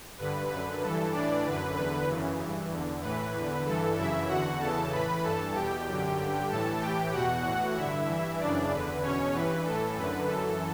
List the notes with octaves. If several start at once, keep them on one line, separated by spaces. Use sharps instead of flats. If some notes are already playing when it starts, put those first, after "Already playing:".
G2 D3 B4
F#2 D3 B4
G2 E3 A4
A2 E3 D4 D5
F#2 D3 B4
E2 D3 B4
F#2 C#3 E3
G2 E3
E2 D3
A2 E3 B4
E2 D3
G2 E3 A4
F#2 C#3 E3 E4 E5
E2 D3 F#4 F#5
E2 C#3 E3 A4 A5
A2 E3 B4 B5
G2 E3 A4 A5
E2 B2 G4 G5
F#2 D3
G2 D3
A2 E3 A4 A5
A2 E3 G4 G5
E2 B2 F#4 F#5
A2 E3
G2 D3 E4 E5
G2 E3
F#2 C#3 E3 D4 D5
E2 D3 B4
E2 B2 C#4 C#5
G2 E3 B4
A2 E3 A4
F#2 D3 B4
F#2 E3 A4